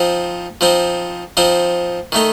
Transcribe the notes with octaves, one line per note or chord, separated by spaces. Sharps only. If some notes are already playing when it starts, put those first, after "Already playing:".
Already playing: F3 C4 D#4
F3 C4 D#4
F3 C4 D#4
D#3 A3 D#4